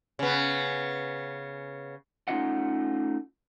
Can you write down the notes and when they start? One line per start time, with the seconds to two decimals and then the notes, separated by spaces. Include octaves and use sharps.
0.19 C#3 B3
2.28 A3 C#4 D#4 F4 D#5 F#5